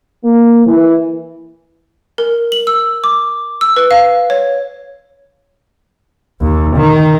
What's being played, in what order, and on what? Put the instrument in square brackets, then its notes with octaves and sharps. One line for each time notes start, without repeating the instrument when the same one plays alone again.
[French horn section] A#3
E3
[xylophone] A#4
F#7
E6
D6
E6
B4
F5
C#5
[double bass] D#2
D#3